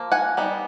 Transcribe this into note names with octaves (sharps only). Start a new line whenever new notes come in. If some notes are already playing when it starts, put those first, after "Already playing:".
Already playing: F3 A#3
F#5 G#5
G3 B3 D#4